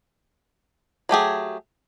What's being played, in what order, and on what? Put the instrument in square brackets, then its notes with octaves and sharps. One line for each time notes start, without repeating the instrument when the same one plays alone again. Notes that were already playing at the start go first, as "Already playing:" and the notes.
[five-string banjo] F#3 A3 G4 G#4